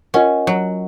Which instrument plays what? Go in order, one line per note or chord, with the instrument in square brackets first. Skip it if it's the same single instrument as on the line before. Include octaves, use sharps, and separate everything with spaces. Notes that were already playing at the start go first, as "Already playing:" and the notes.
[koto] C#4 [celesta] F4 A#4 D#5 F#5
[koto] F#3